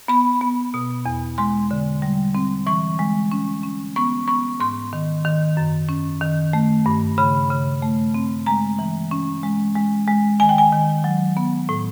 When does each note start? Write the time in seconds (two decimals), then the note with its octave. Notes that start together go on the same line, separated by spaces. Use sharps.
0.08 B3 B5
0.41 B3
0.74 B2
1.06 E2
1.38 G#3 C6
1.71 D3
2.02 G3
2.35 C4
2.66 E3 C#6
2.99 G#3
3.32 C#4
3.63 C#4
3.96 B3 C#6
4.28 B3 C#6
4.60 G#2 C6
4.93 D#3
5.25 D#3
5.57 F#2
5.89 C#4
6.21 D#3
6.53 A3
6.86 G2
7.18 C#3 B5
7.50 C#3
7.82 A3
8.14 C4
8.46 G#3 A#5
8.79 E3
9.11 C#4
9.43 G#3
9.76 G#3
10.08 G#3
10.40 D#3 G#5
10.49 G5
10.58 G#5
10.72 D#3
11.04 F#3
11.37 B3
11.69 A2